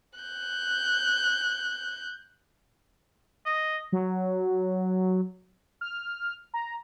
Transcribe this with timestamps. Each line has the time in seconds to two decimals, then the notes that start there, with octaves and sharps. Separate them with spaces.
0.19 F#6 G6
3.46 D#5
3.92 F#3
5.81 F6
6.54 A#5